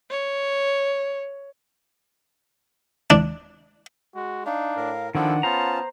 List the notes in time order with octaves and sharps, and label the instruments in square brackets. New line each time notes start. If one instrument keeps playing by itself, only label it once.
[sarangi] C#5
[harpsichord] D4
[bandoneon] G#3 [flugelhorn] F#4
[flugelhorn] D4 [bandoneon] D#4 [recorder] F5
[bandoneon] A2 A#4
[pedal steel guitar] D#3 D4 [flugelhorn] F3 [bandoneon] E4 A4 [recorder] F#5
[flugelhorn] B3 [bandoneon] C#4 F4 A5 [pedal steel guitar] C5 A#5